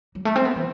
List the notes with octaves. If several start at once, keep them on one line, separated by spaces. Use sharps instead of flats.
F#3
A3
C4
B3
E3